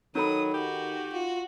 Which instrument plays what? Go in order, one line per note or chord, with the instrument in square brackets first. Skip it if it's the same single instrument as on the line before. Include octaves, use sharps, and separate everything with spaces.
[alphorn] D#3 [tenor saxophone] F#3 [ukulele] D#4 A4 B5 [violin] D#6
[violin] F#4 [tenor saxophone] G4
[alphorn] F4 [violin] F#4